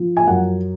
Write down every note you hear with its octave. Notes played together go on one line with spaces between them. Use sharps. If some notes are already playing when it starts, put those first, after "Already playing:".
Already playing: F3
G#5
F#2 F#5